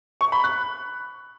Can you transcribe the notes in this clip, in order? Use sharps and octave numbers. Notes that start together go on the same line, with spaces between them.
C#6
B5
F#6